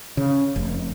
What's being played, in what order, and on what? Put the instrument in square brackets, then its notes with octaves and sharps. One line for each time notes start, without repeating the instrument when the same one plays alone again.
[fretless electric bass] C#3
F1